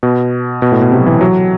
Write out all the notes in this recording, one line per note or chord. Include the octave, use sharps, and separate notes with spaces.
B2
B2
A2
B2
C3
F#3
E3
F#3